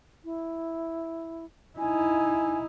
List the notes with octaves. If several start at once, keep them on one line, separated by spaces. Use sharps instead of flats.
E4
D#4 E4 G#5